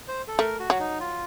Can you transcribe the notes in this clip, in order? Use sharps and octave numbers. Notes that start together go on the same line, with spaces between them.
C5
A4
A3 A#4
F#4
F#3
D#4
F4